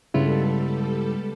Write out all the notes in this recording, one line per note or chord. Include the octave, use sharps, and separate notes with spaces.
C#2 G2 C#3 G3 B3 E4 F4 A4